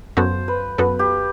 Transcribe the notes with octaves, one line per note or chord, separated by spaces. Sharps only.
F#2 F#3 B3 F#4 A4 C5
B4
F#2 F#3 B3 F#4 A4 B4
G4